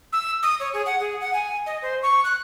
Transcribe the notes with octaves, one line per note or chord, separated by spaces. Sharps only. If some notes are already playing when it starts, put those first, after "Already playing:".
E6
D#6
C#5
G#4
F#5
G#4
F#5
G#5
D#5
C5
C#6
F#6